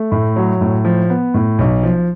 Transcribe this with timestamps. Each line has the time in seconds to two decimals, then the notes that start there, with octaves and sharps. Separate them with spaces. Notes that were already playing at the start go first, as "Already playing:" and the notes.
Already playing: A3
0.12 A2
0.36 F#3
0.61 A2
0.85 F3
1.10 B3
1.34 A2
1.59 B1
1.83 F3